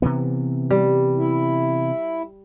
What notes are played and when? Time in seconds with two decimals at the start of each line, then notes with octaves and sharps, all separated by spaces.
0.02 C3 E3 B3
0.71 G3
1.17 E4